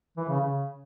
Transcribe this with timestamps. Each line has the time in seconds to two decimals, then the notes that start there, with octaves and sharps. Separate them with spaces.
0.17 E3
0.29 C#3
0.40 C#3